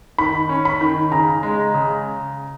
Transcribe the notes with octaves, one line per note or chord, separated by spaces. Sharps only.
D#3 B5
C#4
B5
D#3
C#3 A#5
G#3
C#3